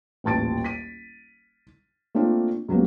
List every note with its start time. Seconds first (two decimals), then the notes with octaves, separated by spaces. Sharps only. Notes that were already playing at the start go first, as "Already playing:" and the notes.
0.24 D#1 A1 A5 A6 D7
0.64 B6 D#7
2.15 A3 A#3 C4 D4 F4
2.68 C#2 C#3 F#3 G3 A#3 B3